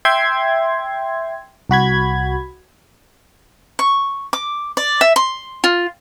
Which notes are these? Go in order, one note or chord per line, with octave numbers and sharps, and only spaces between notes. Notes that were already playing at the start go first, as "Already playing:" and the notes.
E5 G5 C6 G#6
C2 F#4 B5 G#6
C#6
D6
D5
E5
C6
F4